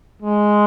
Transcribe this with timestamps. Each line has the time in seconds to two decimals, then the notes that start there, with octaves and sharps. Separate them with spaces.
0.22 G#3